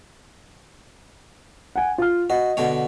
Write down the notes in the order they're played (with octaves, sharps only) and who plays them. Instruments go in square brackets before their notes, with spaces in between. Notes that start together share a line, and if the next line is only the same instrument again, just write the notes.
[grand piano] F#5 G#5
F4 F6
[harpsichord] F#4 [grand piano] D#5
[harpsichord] B2 D3 C#5